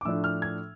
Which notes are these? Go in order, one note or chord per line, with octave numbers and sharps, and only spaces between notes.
D6
A2 F3 A3 D4 E6
F6
G#6